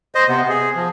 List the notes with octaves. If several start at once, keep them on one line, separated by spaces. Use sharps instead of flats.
C5 D#5
C3 B3
G#4
F3